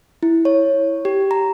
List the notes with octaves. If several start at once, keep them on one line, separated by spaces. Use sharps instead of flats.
E4
C#5
G4
A#5